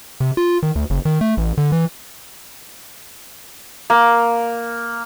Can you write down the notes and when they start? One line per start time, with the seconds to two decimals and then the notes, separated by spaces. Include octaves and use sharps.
0.20 C3
0.37 F4
0.63 D#3
0.75 D2
0.90 F#1
1.05 D#3
1.21 A3
1.37 A1
1.58 D3
1.72 E3
3.90 A#3